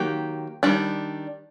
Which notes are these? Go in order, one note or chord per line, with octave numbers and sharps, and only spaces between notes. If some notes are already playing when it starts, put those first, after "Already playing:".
Already playing: D#3 F#3 A#3 G4
D#3 G3 D4